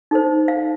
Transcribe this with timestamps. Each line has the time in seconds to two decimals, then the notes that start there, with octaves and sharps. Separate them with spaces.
0.11 D#4 A4 C5
0.48 F5